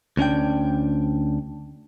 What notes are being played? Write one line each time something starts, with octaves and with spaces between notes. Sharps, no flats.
D2 C#4 D4 G5